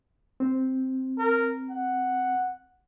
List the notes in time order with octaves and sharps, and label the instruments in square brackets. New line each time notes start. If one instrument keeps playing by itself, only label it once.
[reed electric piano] C4
[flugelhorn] A#4
F#5